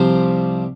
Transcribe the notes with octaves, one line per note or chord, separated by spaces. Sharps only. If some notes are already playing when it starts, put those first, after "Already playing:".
Already playing: C2 C3 F3 C5